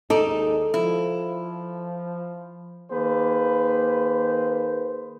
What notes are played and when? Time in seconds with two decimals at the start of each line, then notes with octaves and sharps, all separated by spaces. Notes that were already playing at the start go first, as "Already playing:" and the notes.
0.10 D#2 G#3 D#4 A4 D5
0.74 F3 E4
2.91 D#3 A#3 G#4 B4 C5